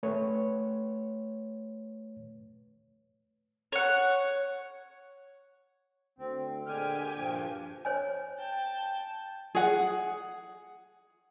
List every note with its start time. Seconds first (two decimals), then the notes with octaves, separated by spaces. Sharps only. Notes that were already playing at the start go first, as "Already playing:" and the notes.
0.03 A3 B4 C#5
3.72 C#5 F#5
6.19 D2 C4
6.66 A#2 D3 G#3 G4 G5 G#5 F6
7.16 A#1 G2 F3
7.85 C5 C#5 G#5
8.38 G5 A5
9.55 G#4 F#5